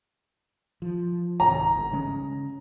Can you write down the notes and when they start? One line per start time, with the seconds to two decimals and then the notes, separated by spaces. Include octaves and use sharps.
0.82 F3
1.40 C2 G#2 D#3 A#5
1.75 G1
1.92 C#3 G#3 C#4